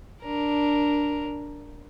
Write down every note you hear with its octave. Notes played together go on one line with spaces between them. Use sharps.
D4 A#4